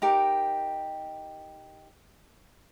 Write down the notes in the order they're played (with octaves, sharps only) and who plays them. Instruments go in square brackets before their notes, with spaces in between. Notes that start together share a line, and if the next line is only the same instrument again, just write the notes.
[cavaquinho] D#4 G4 A#4